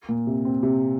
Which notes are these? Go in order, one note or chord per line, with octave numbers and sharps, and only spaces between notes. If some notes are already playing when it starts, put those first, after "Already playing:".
A#2
C3
C4
C3